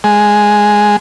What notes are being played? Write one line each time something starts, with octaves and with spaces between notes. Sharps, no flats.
G#3